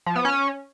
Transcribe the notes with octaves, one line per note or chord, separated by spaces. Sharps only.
F3
B3
C#4